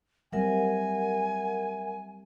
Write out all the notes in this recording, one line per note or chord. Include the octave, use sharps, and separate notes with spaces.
F#3 G3 C4 A#4 E5 F#5 G#5